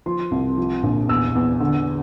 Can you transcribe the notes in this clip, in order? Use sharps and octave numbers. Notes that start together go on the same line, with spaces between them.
F3 C6
C2
F3
A#1
E2 E6
E2
D3